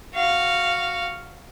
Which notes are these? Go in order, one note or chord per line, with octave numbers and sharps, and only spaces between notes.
F#4 F5